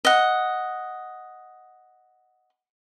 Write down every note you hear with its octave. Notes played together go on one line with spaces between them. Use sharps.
D#5 F#5